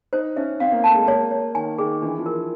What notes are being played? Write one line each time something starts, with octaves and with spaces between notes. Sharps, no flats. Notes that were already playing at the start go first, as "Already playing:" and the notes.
D#4 C5
C#4 E5
C4 F5
A#3
A3 A5
G#3
A#3 C#5
C#5
D#3 G#5
D#3 G#4
E3 D4
F3
A#4